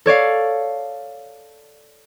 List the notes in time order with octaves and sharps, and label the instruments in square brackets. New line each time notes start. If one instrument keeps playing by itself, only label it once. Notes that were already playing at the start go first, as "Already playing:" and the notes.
[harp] A4 C#5 D5 F5